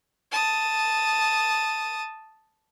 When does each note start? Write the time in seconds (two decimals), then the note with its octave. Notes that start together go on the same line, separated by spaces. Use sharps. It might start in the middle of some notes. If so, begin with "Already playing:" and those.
0.32 A5 D#6